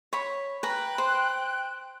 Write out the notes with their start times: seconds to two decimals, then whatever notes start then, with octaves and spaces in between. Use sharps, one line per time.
0.13 C#5 B5
0.63 B4 G5 A#5 F#6
0.98 C5